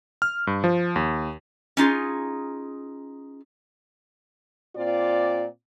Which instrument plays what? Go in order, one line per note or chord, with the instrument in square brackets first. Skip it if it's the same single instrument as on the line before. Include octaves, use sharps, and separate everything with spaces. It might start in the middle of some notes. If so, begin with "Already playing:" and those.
[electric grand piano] F6
G2
F3
D#2
[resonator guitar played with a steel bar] C#4 D#4 F4 G#4
[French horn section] A#2 C4 F4 D5